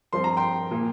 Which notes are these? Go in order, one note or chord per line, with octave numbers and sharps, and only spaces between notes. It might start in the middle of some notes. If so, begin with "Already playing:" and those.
G2 F3 C4 C6
A#5
G5 C6
A#2 F3 A#3